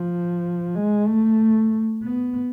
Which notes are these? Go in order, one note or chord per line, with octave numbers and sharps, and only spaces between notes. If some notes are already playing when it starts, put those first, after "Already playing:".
Already playing: F3
G#3
A3
B3